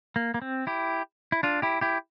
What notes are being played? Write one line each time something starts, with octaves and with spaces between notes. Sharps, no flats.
A#3
A#3
C4
E4 G4
E4
D4 F4
E4 G4
E4 G4